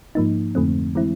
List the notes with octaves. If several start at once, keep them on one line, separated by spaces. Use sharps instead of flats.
G#2 F3 A#3 D#4
F2 D3 F3 A3 C4
E3 G#3 C4 E4